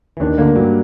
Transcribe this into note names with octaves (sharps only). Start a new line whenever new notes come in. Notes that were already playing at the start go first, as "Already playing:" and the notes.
E3
D#2 D#3 D4
D2 D3 A#3
G2 F#3 G3